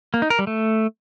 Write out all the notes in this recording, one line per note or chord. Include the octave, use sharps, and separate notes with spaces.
A#3
D#4
A#4
G3
A3